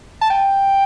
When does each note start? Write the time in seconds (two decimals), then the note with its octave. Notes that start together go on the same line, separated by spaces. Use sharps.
0.21 A5
0.30 G5